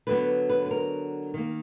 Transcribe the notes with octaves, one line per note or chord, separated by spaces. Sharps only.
D3 F#3 B3 B4
B4
B4
A#4
D#3 A#3